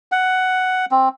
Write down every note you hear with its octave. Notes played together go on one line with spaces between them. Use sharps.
F#5
C4